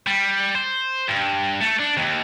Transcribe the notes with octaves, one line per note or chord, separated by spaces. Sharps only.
G3
C5
G2
A3
D4
D#2